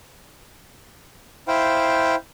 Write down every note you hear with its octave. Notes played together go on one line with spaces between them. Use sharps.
E4 C5 F5 G5